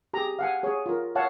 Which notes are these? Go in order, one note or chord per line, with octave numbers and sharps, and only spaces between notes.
G4 G#4 A#5
F5 F#5 G#5
G#4 C#5
F4 A#4
C#5 F5 F#5 A5